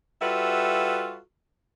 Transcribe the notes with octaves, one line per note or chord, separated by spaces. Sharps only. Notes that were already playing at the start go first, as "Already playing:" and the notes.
G3 F4 F#4 A4 B4 E5